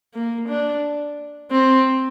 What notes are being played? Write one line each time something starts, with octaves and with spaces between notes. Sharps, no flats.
A#3
D4
C4